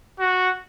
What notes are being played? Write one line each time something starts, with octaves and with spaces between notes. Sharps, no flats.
F#4